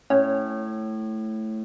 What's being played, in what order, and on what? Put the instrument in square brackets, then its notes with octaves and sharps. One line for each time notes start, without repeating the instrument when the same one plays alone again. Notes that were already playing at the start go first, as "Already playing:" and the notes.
[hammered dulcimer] A2 [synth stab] C#4